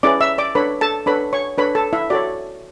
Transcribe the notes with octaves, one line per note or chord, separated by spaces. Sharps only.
C#4 E4 G#4 B4 D5 D6
E5 E6
D5 D6
D4 A4 B4 C#5 B5
A4 A5
D4 A4 B4 C#5 B5
C#5 C#6
D4 A4 B4 C#5 B5
A4 A5
E4 E5
F#4 A4 C#5 D5